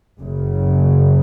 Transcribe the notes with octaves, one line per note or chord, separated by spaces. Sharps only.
F#1 F#2 C#3